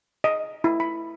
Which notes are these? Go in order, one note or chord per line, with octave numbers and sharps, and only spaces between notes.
D#5
E4
B5